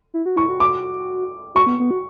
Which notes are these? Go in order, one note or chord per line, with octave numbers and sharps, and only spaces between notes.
E4
F#4
E4 C#6
F#4
D6
F#4 C#6
B3
B3
F#4